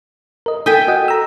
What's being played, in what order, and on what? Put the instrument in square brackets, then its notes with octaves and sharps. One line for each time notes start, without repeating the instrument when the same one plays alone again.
[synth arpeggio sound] A#4 D#5
[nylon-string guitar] A4 G5 G#5 [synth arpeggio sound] D#6 G6 B6
[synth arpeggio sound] F#4 D#5 F#5
A#5 E6